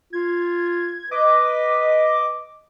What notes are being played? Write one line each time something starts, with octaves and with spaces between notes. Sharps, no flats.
F4 G#6
B4 D#5 D6